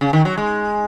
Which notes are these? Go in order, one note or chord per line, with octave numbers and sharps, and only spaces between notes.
C#3
D#3
F#3
G#3